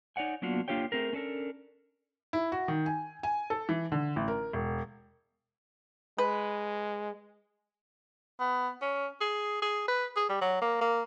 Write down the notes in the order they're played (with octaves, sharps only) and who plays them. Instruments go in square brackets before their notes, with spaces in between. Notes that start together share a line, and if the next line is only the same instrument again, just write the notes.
[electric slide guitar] D#4 C#5 D5 F#5 G#5
F#3 A#3 B3 D4 F4 F#4
A#3 D4 F4 G4 C#5 G5
A3 C4 G#4 A#4
C#4 D4 A4 A#4
[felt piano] E4
F#4
D#3
G#5
G#5
A4
E3
D3
A1
A#4
E1
[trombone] G#3 [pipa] B4
[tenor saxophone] B3
C#4
G#4
G#4
B4
G#4
G3
F#3
A#3
A#3